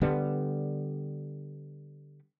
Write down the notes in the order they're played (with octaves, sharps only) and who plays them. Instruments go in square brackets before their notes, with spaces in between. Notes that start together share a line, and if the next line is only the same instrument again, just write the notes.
[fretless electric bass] D3 G3 B3